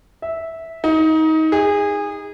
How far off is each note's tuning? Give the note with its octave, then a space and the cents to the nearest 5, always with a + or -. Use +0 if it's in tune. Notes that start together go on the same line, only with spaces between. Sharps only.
E5 -10
D#4 +25
G#4 -25